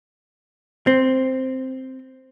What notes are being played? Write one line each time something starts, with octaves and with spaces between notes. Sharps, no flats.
C4